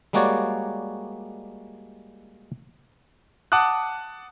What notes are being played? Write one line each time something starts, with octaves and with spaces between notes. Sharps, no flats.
G3 G#3 A#3 F#4 C#5 D5
F#5 A5 D6 D#6 F#6